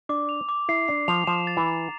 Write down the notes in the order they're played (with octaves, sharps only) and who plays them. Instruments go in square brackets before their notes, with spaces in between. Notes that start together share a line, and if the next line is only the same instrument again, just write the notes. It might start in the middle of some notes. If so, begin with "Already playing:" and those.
[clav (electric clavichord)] D4 [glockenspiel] D6
[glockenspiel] F7
D6
[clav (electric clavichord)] E4 [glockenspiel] C7
[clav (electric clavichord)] D4 [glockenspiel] C7
[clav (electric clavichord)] F3 [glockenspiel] F7
[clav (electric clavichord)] F3 [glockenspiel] E7
[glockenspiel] A6
[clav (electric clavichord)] E3
[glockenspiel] A#5